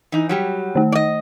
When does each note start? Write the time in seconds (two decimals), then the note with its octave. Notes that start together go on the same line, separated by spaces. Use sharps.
0.12 E3 D#4
0.29 F#3 G3 G4
0.75 D#3 A3
0.92 D5 D#5